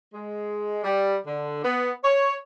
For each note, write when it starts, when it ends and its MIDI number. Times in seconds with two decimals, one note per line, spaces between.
0.14 0.82 56
0.84 1.16 55
1.26 1.60 50
1.64 1.92 59
2.04 2.33 73